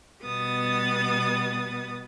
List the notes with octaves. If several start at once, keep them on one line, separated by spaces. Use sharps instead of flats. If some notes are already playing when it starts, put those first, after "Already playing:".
B2 G3 B3 D#6 A6